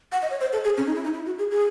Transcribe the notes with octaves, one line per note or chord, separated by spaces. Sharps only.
F#5
D#5
C#5
C5
A4
G#4
C#4
D#4
E4
D#4
E4
F#4
G#4
G#4